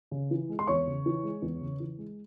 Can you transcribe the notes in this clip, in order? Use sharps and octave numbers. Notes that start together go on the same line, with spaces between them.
C#3
E3
G#3
C6
E2 C#5 C#6
C#3
E3
G#3
E2
C#3
E3
G#3